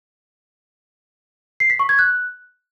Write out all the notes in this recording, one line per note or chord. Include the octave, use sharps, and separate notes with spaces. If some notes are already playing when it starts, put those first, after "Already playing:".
C7
B6
C#6
G#6
F#6